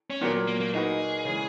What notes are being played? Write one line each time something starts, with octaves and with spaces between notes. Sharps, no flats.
C#4
A#2 F#3 A#3 B3
A#3
A#3
A#3 D#4 F#4 G#4 B4
C#3 E3 G#3